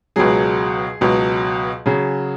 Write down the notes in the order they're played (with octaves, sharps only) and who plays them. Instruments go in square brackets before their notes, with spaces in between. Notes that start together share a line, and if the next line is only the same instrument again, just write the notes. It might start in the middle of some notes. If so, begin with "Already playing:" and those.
[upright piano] C#2 B2 F#3 G#4
C#2 B2 F#3
C#3 F#3 G#4